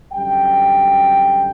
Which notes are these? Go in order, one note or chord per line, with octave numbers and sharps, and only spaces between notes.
F#2 D3 G3 G5